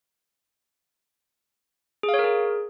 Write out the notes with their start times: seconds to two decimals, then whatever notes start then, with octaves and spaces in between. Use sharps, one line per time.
2.03 G#4
2.09 F5
2.14 C#5
2.19 A#4
2.24 G#4